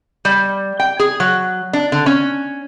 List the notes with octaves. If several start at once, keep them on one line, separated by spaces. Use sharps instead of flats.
G3
G5
G#4
F#3
D4
D3
C#4